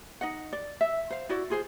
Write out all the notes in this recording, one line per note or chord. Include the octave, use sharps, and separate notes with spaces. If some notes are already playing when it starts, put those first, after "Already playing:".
D#4 D#5 F#5
D5
E5
C5 F5
E4 F#4 D5
F4 G#4 C5